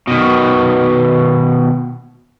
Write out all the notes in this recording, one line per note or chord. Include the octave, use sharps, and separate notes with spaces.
B2 D#3